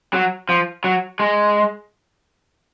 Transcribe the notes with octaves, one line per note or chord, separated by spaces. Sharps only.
F#3
F3
F#3
G#3